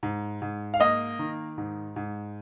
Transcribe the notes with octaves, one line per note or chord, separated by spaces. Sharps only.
G#2
G#2
F5
A#3 D#5
D#3
G#2
G#2